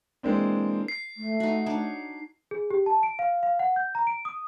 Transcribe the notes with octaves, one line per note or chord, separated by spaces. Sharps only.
E3 G#3 A#3 C4 D4
C7
A3
D#4 F#4
D4 D#4 C#5
G#4
G4
A5
D7
F5
F5
F#5
G6
A#5
D7
D#6